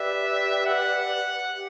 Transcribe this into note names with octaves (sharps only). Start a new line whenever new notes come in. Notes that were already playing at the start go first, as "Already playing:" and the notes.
Already playing: G4 B4 D5 E5
F#5
G4